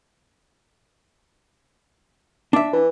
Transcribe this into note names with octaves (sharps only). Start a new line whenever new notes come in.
D4 E5
E3